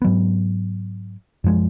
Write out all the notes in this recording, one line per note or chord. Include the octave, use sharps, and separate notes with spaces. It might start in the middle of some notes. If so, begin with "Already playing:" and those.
G#2 F#3 B3
F#2 F3 G#3